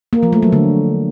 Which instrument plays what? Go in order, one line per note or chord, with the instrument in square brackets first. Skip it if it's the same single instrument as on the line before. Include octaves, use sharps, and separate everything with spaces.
[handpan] A#3
F3
A3
F#3
D3